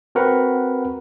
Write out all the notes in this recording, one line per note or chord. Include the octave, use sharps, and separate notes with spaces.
C4 F#4 A#4 B4 F#5